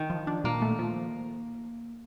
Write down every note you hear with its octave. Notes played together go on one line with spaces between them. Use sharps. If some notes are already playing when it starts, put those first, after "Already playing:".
Already playing: D#3
F3
D4
A#2 A#3
A3
F3